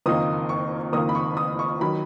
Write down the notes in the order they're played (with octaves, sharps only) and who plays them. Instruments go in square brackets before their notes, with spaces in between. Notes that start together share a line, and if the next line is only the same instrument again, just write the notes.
[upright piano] F#1 F2 D#3 A#3 D#4 D#6
C#6
F#1 F2 D#3 A#3 D#4 D#6
B5
C#6
D#6
C#6
D#3 F#3 B5